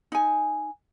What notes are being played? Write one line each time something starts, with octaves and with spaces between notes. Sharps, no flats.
D#4 G#5